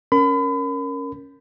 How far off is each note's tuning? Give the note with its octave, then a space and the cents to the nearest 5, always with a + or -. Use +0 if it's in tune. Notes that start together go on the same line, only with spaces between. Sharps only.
C#4 +0 A#4 +0 B5 +35